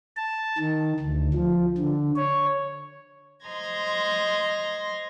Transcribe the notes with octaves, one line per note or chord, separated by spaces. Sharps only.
A5
D#3
D2
F3
D3
C#5
C5 D#5 A#5 C6 G#6 A#6